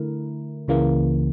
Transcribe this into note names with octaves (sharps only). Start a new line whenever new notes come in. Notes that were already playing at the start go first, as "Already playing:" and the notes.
Already playing: D3 A3 E4 A#4
C#2 C#3 E3 A#3